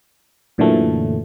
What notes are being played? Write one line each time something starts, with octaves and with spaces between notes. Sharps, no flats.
F#2 A#2 D3 E3 F#3 A3